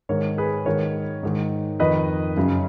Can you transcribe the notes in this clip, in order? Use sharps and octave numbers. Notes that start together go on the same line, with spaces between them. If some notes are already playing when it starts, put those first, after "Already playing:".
G#2 D#3 A#4 C#5
G#4 B4
G#2 D#3 A#4 C#5
G#2 D#3
F2 D#3 B4 D#5
F#2 C#3